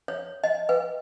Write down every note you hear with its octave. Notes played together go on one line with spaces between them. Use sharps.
C#5
D#5
B4